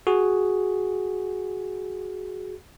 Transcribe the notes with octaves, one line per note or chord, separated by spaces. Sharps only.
F#4 G#4